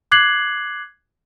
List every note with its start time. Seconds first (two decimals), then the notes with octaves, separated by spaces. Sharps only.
0.12 D6 F#6 G#6 C7 F#7